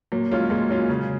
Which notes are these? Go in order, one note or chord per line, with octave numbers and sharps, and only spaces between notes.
A#2 F#3
F#3 G#3 C#4 F4
A#2 G#3
F#3 C#4 F4
C#3